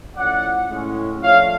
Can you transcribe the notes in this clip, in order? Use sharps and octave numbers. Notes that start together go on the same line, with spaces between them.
A2 F3 A3 C#4 D5 F#5
A2 G#3 C#4
F3 A3 D4 C#5 F5